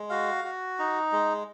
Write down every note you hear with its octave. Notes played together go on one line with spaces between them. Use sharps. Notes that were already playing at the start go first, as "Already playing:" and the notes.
Already playing: G#3
F#4 F5
F#4
D#4
G#3